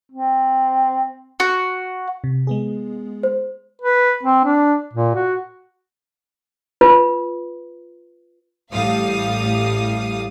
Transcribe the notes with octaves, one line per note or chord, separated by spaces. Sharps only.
C4
F#4
C3
G#3 B3 G#4
C5
B4
C4
D4
A#2
F#4
F4 B4
A1 A2 G3 F5 D#6